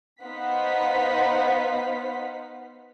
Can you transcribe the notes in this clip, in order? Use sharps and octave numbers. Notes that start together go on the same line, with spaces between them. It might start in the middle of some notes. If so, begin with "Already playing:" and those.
B3 D#4 C5 F5 F#5 B6